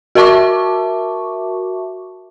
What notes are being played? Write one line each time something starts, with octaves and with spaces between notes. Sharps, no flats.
F#4 A#4 E5 A5 C#6 D6